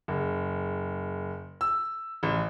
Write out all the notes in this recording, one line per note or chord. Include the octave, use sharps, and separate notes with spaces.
F#1
E6
A1